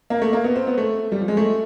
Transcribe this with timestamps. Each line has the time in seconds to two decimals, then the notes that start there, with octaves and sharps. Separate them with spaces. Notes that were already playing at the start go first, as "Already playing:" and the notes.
0.10 A#3
0.22 A3
0.33 A#3
0.44 B3
0.56 C4
0.67 B3
0.78 A3
1.12 G3
1.20 F3
1.28 G#3
1.37 A3